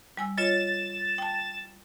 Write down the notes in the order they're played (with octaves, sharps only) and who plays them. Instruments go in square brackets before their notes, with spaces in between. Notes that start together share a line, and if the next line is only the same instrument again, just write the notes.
[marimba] G3 G#5 E6
[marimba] F4 C#5 D#5 [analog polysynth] A6 E7
[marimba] G5 A5